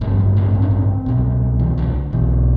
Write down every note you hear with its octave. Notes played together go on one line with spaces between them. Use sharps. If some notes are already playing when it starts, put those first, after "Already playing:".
A1 G2 D3 A3
G3
A3
C4
D4
C4
C2 B2
E3
D3
B1 B2 E3